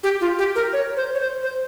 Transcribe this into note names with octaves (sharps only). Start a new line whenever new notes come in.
G4
F4
G4
A#4
C#5
C5
C#5
C5
C5